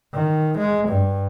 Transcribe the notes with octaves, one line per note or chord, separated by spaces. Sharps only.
D#3
G#3
G2